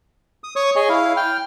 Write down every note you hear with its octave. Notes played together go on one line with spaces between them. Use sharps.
D#6
C#5 C#6 D#6
G#4 C#5 D#5 G#5
E4 F5
G5 F6